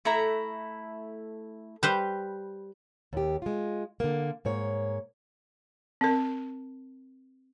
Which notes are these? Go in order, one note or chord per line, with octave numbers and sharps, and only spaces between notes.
A3 E4 A#5
G3 B4 C5 G6
D#2 G4
G#3 F4
D3 A#3
G#2 A#3 C#5
C4 A#4